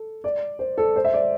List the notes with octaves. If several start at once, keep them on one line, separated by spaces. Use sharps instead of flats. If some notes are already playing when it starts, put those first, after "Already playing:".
Already playing: A4
D5
C5
A4
C5
E5
D5